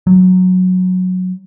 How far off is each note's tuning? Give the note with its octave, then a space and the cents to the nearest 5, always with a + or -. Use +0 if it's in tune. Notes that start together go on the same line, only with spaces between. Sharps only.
F#3 -10